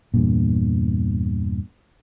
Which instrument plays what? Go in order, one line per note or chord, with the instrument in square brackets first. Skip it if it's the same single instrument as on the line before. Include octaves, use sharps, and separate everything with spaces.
[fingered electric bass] E2 G2 A#2